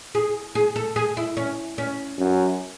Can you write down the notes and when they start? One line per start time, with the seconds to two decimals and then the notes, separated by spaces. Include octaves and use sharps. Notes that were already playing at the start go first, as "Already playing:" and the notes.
0.15 G#4
0.55 G#4
0.76 A4
0.96 G#4
1.17 E4
1.37 C#4
1.78 C#4
2.18 F#2